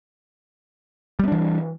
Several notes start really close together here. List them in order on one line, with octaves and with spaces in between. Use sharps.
G3 B3 D4 E3